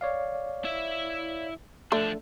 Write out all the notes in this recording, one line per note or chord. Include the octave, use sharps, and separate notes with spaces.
C#5 D5 F5
E4 E5
D3 F3 A3 D4